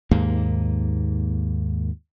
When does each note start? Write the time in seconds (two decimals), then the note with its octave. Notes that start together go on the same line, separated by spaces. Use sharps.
0.11 D#2 G#2 A#3